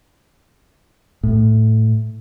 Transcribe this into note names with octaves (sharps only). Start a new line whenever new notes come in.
A2